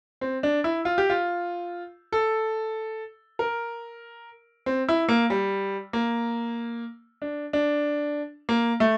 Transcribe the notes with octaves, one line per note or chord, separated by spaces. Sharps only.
C4
D4
E4
F4
G4
F4
A4
A#4
C4
E4
A#3
G3
A#3
D4
D4
A#3
A3